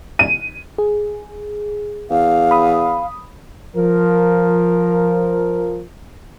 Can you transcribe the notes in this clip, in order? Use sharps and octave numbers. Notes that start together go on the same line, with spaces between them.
D#7
G#4
E2 F5
B5 D#6
F3 A#4